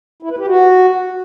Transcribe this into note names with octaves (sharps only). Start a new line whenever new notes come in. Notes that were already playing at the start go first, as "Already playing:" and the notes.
E4
B4
G4
F#4